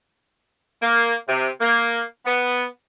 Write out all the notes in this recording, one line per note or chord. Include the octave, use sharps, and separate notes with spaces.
A#3
C3
A#3
B3